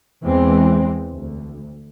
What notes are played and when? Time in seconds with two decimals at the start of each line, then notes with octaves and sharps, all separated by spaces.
0.23 E2 E3 G#3 C4
1.13 D2